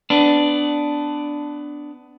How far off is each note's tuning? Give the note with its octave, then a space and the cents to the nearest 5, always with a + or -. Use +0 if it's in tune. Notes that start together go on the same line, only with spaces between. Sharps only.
B3 +20 D4 +0